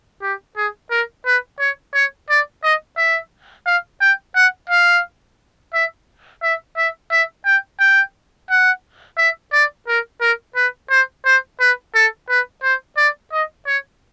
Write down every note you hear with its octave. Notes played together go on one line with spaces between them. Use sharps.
G4
G#4
A#4
B4
C#5
C#5
D5
D#5
E5
F5
G5
F#5
F5
E5
E5
E5
E5
G5
G5
F#5
E5
D5
A#4
A#4
B4
C5
C5
B4
A4
B4
C5
D5
D#5
C#5